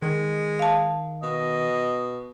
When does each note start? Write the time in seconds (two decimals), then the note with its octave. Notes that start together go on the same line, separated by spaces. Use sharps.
0.02 D#3 G#3
0.59 F5 A5
1.23 B2 D#5